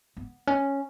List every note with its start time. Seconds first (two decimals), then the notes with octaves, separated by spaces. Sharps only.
0.17 B3
0.47 C#4